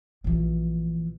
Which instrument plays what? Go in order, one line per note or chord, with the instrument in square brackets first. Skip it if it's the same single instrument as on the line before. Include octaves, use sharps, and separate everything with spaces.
[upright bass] A#1 E3